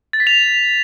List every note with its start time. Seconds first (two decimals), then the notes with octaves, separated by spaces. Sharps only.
0.13 A6
0.20 B6
0.27 F7